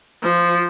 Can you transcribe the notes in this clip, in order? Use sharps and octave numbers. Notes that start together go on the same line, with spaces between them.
F3